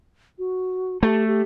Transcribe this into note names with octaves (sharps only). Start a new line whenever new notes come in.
F#4
A3 G4
G4